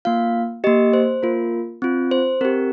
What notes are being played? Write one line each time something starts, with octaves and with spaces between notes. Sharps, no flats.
A#3 F4 F5
A#3 G4 D#5
C5
A#3 F4 A#4
C4 F4
C5
C4 G4 A#4